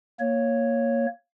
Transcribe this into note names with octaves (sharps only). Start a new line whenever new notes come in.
A#3 C#5